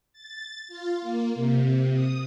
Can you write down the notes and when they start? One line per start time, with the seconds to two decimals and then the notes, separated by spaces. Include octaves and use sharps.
0.13 A6
0.68 F4
1.02 A#3
1.35 C3
1.94 D#6